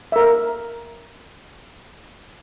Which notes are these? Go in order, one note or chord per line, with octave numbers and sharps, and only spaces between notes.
A#4 E5